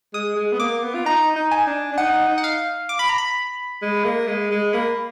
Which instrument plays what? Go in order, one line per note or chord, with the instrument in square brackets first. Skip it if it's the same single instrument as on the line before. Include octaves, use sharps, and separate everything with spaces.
[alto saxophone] G#3 [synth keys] D#6
[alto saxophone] G#3
B3
[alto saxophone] A#3 [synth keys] D6
[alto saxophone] B3
F4
[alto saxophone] D#4 [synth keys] A#5
[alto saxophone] D#4
[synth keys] G#5
[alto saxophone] D4
D4
[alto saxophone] D#4 [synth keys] F#5
[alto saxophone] D#4
[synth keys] F#5
F5
D6
B5
A#5
B5
[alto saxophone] G#3
A#3
G#3
G#3
[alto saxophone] A#3 [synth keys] B5